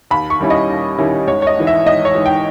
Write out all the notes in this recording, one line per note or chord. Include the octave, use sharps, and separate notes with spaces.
D#2 B5
C#6
D#3 G3 C#4 E4
D#5
D#2
D#3 G3 C#4 E4
G#1 C#5
C#5
D#5
G#2 E3
E5
G#1 D#5
C#5
G#2 E3
G5